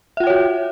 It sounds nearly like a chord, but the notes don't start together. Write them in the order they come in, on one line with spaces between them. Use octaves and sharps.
E5 F4 G5 C#5 F#4